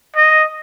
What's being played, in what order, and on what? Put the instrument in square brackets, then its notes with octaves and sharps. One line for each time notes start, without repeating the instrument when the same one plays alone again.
[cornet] D#5